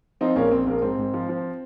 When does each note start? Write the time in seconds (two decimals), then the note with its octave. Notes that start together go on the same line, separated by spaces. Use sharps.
0.21 F3 C4 D#4
0.36 A#1 A#3 C#4
0.51 A#1 C4
0.67 A#1 A#3
0.82 G#2 C4
0.98 G#2
1.14 F3
1.29 F3